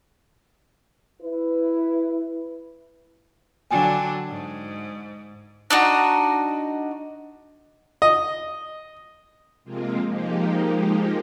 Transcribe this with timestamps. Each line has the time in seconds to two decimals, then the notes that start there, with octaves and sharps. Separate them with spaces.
1.22 E4 B4
3.71 D3 F#3 D4 G5 G#5
4.29 G#2
5.70 D4 D#4 F#4
8.02 D#5
9.64 C3 F3 G#3 A#3 C4 F4
10.06 F3 G#3 A#3 D#4 G4